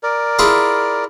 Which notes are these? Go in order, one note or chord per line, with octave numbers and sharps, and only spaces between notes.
A#4 D5
E4 F4 G#4